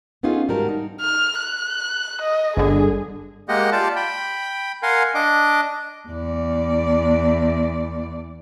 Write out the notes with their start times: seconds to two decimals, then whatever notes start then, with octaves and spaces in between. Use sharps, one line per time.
0.23 B3 C#4 D#4 F4 G#4 A4
0.48 G#2 G3 F#4 A#4 A5
0.69 D#4
1.01 F6
1.39 F#6
2.22 D#5
2.57 G1 D3 G#4
3.49 G#3 A#3 G4 D#5 F#5
3.72 F4 G4 D5 A5
3.96 G5 B5
4.83 A#4 F5 F#5 G#5 C6
5.15 D4 D#5 D6
6.08 E2 D5